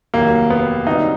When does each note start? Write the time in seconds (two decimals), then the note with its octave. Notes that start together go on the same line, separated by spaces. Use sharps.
0.14 F1 D#2 D#3 F#3 A#3
0.50 B3
0.87 F1 F2 D3 F#3 D#4